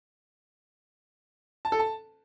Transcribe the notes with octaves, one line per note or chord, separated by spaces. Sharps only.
A5
A4
A5